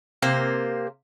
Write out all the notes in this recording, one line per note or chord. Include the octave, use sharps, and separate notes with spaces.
C3 A#3 C5